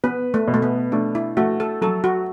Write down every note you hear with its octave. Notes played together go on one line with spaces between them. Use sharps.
B3 B4
A3
B2
A3
B3
A3 D4
E4
A3 F#4
A4
F#3 A4
F#4